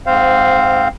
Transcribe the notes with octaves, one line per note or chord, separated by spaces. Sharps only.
G#2 C4 C5 F5